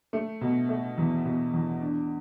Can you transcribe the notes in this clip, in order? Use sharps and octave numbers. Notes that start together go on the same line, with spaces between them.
A3
B2
A3
E2
B2
E2
D4